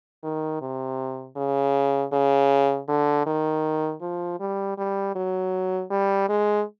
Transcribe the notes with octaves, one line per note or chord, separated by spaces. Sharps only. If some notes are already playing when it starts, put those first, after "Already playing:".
D#3
C3
C#3
C#3
D3
D#3
F3
G3
G3
F#3
G3
G#3